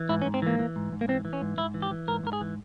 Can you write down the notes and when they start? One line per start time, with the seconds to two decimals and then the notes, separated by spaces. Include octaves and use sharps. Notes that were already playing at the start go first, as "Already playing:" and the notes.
Already playing: E3
0.09 G#2 E4
0.22 C#4
0.25 G#2
0.34 C4
0.42 E3 A#3
0.59 E3
0.76 G#2
0.92 G#2
1.01 A#3
1.08 E3 C4
1.25 E3
1.33 C#4
1.42 G#2
1.58 G#2 E4
1.74 E3
1.82 G4
1.91 E3
2.08 G#2 A#4
2.23 G#2 A#4
2.33 G#4
2.41 E3